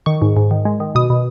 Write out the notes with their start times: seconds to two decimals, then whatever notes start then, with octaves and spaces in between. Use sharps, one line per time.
0.06 D#3 C#6
0.22 G#2
0.37 G#2
0.51 D#3
0.65 G#3
0.80 D#3
0.95 B2 D#6
1.10 B2